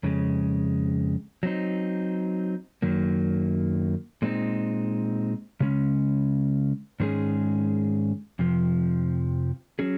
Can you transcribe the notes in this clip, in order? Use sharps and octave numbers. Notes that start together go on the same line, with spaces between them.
F2 C#3 G#3
F#3 C4 D#4
F#2 D#3 F#3 A#3
A#2 G#3 C4 D#4
C#3 G#3 C#4
G#2 D#3 G#3 C#4 G#4
F2 C3 F3
F#3 C#4 G#4